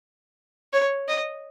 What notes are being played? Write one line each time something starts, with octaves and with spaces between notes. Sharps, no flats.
C#5
D#5